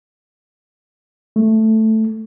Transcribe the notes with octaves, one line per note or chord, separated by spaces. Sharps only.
A3